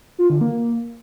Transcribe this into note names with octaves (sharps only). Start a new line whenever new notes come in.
F4
D3
A#3